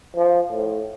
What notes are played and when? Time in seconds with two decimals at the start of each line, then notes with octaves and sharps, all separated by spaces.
0.16 F3
0.52 A2